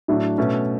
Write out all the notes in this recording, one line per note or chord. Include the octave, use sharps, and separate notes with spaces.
A2 F#3 A3 D4
B2 A3 C#4